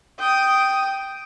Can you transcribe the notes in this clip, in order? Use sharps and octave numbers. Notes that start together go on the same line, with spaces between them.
G5 D#6